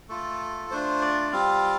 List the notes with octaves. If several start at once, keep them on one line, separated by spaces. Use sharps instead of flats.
A3 F4 A4
A3 D4 F4 C5
D5
G3 C4 F4 F5